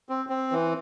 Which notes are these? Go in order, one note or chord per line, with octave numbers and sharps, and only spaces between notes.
C4
C4
E3